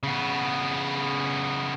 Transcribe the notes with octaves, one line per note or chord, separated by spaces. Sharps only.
C#3 B3